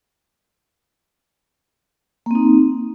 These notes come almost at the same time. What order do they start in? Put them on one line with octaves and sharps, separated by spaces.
A#3 C4 D#4